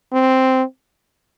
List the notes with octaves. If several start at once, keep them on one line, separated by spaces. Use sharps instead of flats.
C4